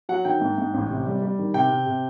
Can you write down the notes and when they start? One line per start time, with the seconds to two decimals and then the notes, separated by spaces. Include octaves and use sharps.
0.09 F#3 F#5
0.25 D#3 G5
0.41 G#2
0.58 G#2
0.74 A1
0.90 C3
1.06 G3
1.22 G3
1.39 D#3
1.54 C3 G5
1.70 C3
1.86 C3